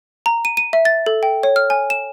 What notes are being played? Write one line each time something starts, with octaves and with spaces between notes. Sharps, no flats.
A#5
D#7
D#7
E5
A6
A4
G5
C#5
F6
G#5
E7